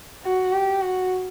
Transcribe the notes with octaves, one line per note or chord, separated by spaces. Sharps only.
F#4
G4
F#4